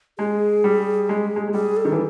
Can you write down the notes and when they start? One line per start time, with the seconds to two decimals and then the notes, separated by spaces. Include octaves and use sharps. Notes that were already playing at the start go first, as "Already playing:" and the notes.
0.18 G#3 G#4
0.64 G3
1.09 G#3
1.36 G#3
1.48 G#3
1.54 G3 G#4
1.77 A4
1.85 D#3
1.92 E3